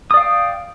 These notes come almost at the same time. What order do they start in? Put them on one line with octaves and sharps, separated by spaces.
D#6 D5 F5 G5